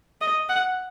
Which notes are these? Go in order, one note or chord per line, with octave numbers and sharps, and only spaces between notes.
D#5
F#5